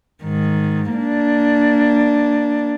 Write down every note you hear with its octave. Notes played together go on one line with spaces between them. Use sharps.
G#2 D#3
A#3 D4